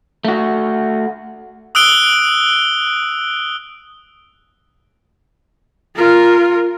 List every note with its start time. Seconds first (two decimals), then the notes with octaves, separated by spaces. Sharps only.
0.25 A3 F#4
1.75 D#6 E6 F#6 D7 G7
5.96 F4 A#4